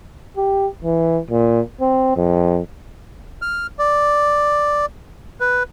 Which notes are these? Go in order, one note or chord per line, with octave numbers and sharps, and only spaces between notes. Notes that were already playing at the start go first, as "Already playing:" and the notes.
G4
E3
A#2
C4
F2
F6
D5
B4